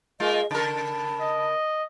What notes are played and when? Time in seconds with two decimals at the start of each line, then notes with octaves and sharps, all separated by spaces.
0.20 G#3 A#3 F4 D#5
0.51 C#3 A#4 A5
1.21 D#5